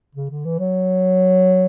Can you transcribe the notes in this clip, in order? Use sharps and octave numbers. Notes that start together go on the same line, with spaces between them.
C#3
D3
E3
F#3